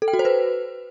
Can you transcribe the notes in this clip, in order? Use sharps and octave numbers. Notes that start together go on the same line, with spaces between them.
A4
G5
F#4
C5
B4